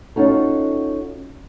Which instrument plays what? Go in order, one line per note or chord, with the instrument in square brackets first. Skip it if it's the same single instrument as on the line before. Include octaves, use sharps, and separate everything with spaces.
[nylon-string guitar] C#4 D#4 F4 F#4 A4